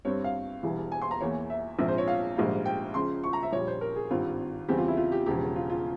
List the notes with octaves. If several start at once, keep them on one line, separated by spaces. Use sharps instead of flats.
G2 G3 C4 C#5
F5
E1 E2 E3 G3
G#5
C6
A#5
E2 E3 A#3 C#5
E5
A#1 G#2 F3 C4 E5
C5
C#5
F5
A#1 G#2 G3 A#3
G5
C#2 C#3 F3 C6
C#6
A#5
E5
A#1 A#2 G3 C#5
C5
A#4
G#4
G#1 G2 G3 C4 F4
E2 C#3 G3 C4 G4
F4
E4
F4
G4
E1 E2 C#3 F3 G#3 G4
F4
F4